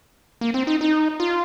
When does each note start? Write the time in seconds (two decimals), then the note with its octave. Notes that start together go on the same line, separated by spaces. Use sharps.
0.41 A#3
0.54 C4
0.67 D#4
0.81 D#4
1.20 F4